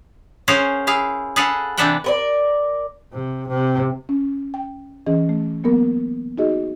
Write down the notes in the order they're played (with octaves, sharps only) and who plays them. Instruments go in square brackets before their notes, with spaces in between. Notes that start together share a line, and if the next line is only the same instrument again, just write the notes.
[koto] C#4 G#4 A#4 C5 F5 F#5
E4 G#4 F5
G#4 A4 B4 F5 F#5 G#5
C3 E3 D4 E5 F#5 G5
[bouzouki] A#4 B4 D5
[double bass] C3
C3
[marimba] C#4
G5
E3 C#4 G#4 D#5
A3
F#3 A#3 B3 A#4
D#4 F#4 G#4 D#5